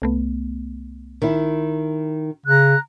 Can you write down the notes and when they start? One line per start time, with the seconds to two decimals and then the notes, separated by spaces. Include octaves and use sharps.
0.02 C2 A3 B3
1.22 D#3 E4
2.46 C#3 A#5 F#6